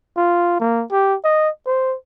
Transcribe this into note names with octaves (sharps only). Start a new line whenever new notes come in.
F4
A#3
G4
D#5
C5